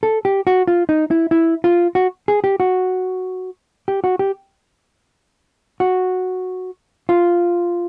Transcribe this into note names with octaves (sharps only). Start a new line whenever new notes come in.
A4
G4
F#4
F4
D#4
E4
E4
F4
F#4
G#4
G4
F#4
G4
F#4
G4
F#4
F4